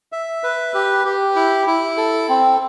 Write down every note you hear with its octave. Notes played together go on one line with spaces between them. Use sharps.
E5
B4
G4
G4
E4
E4
A4
C4